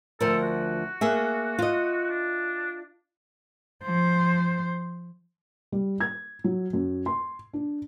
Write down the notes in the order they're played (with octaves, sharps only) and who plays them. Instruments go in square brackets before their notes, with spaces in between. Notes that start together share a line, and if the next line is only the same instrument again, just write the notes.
[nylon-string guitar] D2 F3 A#4 [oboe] A4
[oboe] F#4
[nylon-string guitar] A#3 G#4 E5
F4 D#5
[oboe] D4
[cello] F3 C5
[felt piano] G3
G#6
F#3
F#2
C6
D4